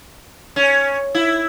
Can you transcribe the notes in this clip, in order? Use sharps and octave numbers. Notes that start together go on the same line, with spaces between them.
C#4
E4